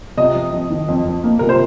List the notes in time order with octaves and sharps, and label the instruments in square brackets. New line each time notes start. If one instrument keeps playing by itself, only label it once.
[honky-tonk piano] C3 [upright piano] D#5
[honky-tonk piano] F2
F2
D#3
F2
F2
A#3
[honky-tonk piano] C3 [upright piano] A#4
[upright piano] C5